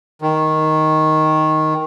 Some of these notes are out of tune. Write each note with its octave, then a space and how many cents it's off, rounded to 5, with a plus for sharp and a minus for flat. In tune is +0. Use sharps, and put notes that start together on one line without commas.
D#3 +5